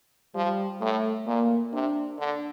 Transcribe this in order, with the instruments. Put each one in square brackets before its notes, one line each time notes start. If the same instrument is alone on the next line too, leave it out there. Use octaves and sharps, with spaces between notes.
[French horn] F3 [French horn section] G3
[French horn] A2 [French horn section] A3
[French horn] A#2 [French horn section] A#3
[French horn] C3 [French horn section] D4
[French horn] D3 [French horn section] D4